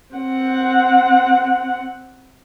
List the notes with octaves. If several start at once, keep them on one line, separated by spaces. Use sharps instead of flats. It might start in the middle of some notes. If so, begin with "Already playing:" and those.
C4 F#5